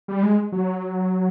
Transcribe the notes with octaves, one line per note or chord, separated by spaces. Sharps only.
G3
G#3
F#3